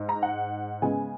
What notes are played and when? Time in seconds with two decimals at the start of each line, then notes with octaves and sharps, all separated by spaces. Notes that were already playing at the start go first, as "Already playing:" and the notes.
Already playing: G#2
0.09 A#5
0.23 F#5
0.82 C#3 G#3 B3 G#5